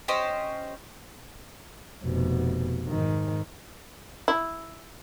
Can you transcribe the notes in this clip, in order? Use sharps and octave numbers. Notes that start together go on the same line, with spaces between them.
C#4 G4 C5 D#5
F1 B2
G#2 D#3
E4